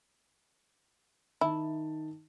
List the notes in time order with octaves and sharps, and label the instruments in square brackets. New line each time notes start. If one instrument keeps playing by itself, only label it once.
[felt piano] D#3 D#4 A5 [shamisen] E4